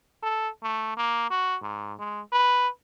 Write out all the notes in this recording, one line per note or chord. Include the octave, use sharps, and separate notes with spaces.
A4
A3
A#3
F#4
G#2
G#3
B4